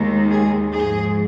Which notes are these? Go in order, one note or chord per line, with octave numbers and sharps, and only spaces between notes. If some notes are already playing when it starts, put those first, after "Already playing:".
Already playing: D#2 D#3 G#3
G#4
G#2 F3 G#3 G#4